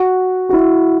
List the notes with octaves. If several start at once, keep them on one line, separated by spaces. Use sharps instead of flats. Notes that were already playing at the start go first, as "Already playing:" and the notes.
Already playing: F#4
F#4
E4